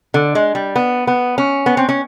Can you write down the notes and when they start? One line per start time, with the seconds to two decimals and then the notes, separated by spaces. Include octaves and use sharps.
0.14 D3
0.35 G#3
0.55 G3
0.76 B3
1.07 B3
1.38 C#4
1.66 B3
1.77 C4
1.89 C#4